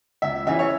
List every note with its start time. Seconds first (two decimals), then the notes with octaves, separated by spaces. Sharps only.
0.22 C#2 E5
0.47 C#3 E3 C#4 E5
0.59 C#5